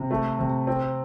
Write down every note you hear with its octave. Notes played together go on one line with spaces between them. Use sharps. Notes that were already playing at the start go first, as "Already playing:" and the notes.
Already playing: C3
A3
C3
C4